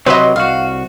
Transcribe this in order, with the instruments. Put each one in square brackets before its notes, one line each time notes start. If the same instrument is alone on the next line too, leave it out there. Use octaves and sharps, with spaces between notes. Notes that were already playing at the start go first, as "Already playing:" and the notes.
[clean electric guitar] C3 F#3 [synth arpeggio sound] B4 D#5 [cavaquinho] C5
[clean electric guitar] C2 F#4 [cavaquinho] F5